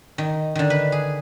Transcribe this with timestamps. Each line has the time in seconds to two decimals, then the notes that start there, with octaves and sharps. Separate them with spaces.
0.18 D#3
0.55 D3 D#3
0.70 B4
0.92 G#4